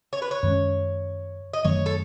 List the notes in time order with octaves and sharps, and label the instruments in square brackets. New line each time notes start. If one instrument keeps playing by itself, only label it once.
[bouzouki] C#5
B4
C#5
[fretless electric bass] F#2 D#3 G#3 C#4
[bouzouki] D#5
[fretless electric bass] F#2 D#3 F#3 A3 [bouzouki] C#5
[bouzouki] A4